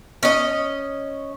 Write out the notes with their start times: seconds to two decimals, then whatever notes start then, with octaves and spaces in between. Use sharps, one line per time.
0.23 C#4 D#5